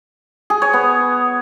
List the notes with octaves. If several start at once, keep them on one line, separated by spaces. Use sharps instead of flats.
G#4
C#5
B3